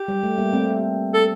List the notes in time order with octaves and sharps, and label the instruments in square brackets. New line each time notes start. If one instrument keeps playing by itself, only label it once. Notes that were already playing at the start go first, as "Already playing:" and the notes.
Already playing: [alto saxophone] G4
[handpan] G3
A3
G3 A#3
A3 C4
[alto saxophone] A4